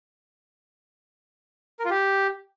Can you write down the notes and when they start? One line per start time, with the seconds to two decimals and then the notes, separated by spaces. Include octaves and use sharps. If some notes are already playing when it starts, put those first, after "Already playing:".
1.80 A#4
1.85 F4
1.90 G4